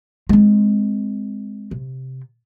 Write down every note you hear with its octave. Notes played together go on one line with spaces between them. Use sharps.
G#3 C4
C3